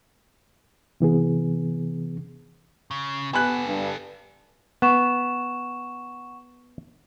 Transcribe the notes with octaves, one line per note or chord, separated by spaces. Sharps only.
C3 E3 B3 G#4
C#3
B3 G4 A4 G#5 B5 F#6
G2
B3 F#5 C#6 E7